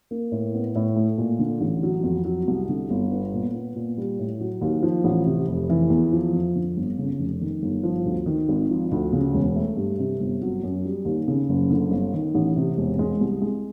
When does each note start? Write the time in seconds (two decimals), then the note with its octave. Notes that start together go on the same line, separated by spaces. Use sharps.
0.11 A#3
0.32 A2
0.54 B3
0.75 A2
0.96 A3
1.18 A#2
1.39 D3
1.61 A1
1.83 F#3
2.04 F2
2.25 F#3
2.48 C2
2.69 D3
2.90 G1
3.12 B3
3.33 A#2
3.55 B3
3.76 A#2
3.98 G3
4.19 A2
4.40 F#3
4.61 D#2
4.83 F3
5.04 A1
5.26 C3
5.48 F1
5.69 E3
5.90 E2
6.12 F3
6.33 F2
6.55 D3
6.77 G1
6.98 C#3
7.19 F1
7.41 D#3
7.62 G1
7.83 F3
8.05 D2
8.26 D#3
8.49 G#1
8.69 F3
8.92 D2
9.13 C#3
9.34 E1
9.56 A3
9.76 G2
9.99 C3
10.20 G1
10.42 F#3
10.63 F#2
10.85 G3
11.05 D#2
11.28 C#3
11.49 F#1
11.71 D3
11.91 G1
12.14 D#3
12.35 A1
12.56 C3
12.77 E1
12.99 G#3
13.21 C2
13.42 G#3